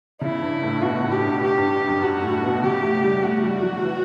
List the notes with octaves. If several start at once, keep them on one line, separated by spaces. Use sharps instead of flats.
C#3 E4
G2
A2
B2 F#4
A2
G4
G2
G4
G2
F#2
G2 F#4
A2
B2
C#3 G4
A3
G3
A3 F#4
G3
F#3
E3